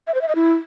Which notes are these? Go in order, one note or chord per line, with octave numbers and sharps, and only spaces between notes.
E5
C5
E5
D#5
E4